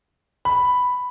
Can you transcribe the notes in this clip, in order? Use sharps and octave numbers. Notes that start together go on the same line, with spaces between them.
B5